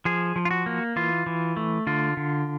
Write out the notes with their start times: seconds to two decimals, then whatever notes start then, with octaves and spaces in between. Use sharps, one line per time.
0.05 F3 G#4
0.36 F3
0.45 F4
0.51 F#4
0.66 A#3
0.96 E3 F4
1.26 E3
1.57 A3
1.87 D3 F4
2.17 D3